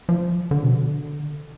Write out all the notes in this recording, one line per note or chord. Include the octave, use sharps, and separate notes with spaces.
F3
D3
B2
D3